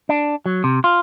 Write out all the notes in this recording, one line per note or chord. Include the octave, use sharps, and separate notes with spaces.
D4
F#3
C3
F4